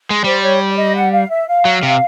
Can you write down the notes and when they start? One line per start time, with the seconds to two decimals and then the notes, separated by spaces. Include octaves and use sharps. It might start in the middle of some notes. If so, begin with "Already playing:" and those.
0.10 G#3
0.24 G3 C5
0.42 C#5
0.69 D5
0.77 D#5
0.94 F#5
1.12 F5
1.30 E5
1.48 F5
1.65 F#3
1.83 C3